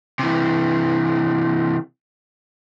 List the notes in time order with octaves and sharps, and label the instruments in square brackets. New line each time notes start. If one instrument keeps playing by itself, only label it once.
[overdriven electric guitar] C3 E3